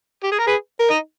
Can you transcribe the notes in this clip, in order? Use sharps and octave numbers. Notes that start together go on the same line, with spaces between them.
G4
G#4
A#4
G#4 B4
A#4
D#4